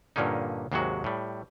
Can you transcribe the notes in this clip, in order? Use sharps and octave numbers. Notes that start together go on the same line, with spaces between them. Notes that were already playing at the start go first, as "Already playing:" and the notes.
G2 A#2 D3 A#3 C#4 D#4
D#2 G#2 C3 F#3 G#3 F#4
A2 G3